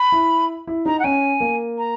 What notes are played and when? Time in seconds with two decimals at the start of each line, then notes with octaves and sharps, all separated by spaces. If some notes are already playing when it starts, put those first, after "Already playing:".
Already playing: B5
0.12 E4
0.67 E4
0.86 D#4 A#5
0.99 F#5
1.04 C#4 G#5
1.40 A#3
1.78 A#5